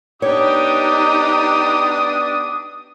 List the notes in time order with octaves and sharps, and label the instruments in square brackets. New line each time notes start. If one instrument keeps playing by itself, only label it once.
[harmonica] B3 D4 D6 [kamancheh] D#4 G4 [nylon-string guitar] C#5 [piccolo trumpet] D#6